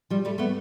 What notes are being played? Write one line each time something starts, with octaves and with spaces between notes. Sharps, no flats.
F3 G3
G3 A3
A3 B3